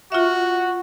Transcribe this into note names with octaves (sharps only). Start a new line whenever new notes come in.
F4 F#4 E5